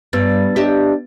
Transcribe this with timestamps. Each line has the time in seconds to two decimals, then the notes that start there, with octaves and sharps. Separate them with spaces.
0.13 G2 B3 B4 A6
0.56 D4 G4 D#5 E5